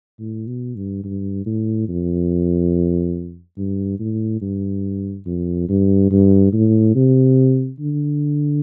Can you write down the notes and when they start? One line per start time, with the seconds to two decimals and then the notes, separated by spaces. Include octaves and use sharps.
0.19 A2
0.47 B2
0.76 G2
1.04 G2
1.46 A2
1.89 F2
3.58 G2
4.00 A2
4.41 G2
5.26 F2
5.69 G2
6.11 G2
6.53 A2
6.95 C3
7.80 D3